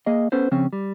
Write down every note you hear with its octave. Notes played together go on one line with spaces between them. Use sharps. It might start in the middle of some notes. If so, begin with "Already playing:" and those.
A#3 G#4 D#5
B3 C#4 A4 B4 C5
C#3 F3 C4 C#4
G3